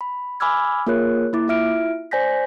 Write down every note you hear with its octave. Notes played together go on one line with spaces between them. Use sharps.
B5
G#5 B5 D6 E6 F6 G#6
A#3 F4 G#4 A#4 C#5 F#6
A#3 E4 D6
E4 F4 E5 F6 D7
C5 D5 G#5 G6 A#6 B6